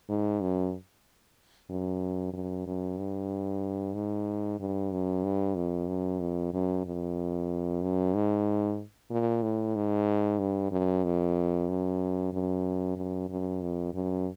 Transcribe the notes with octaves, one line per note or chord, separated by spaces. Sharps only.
G#2
F#2
F#2
F#2
F#2
G2
G#2
G2
F#2
G2
F2
F#2
F2
F#2
F2
F#2
G#2
A#2
A2
G#2
G2
F#2
F2
F#2
F#2
F#2
F#2
F2
F#2